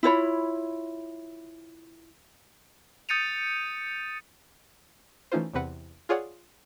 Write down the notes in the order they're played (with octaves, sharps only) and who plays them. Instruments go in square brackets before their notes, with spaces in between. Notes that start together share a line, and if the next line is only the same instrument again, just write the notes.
[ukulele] E4 F4 C#5 B5
[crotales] D#6 G6 A6 C#7 D#7 F7
[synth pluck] E3 A3 C#4 D#4 F4 C5
E2 C3 C4 B4 F#5
F4 G#4 C#5 D5 F#5